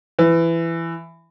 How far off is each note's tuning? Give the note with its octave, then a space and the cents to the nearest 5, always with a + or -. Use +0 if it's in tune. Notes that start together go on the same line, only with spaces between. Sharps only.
E3 +15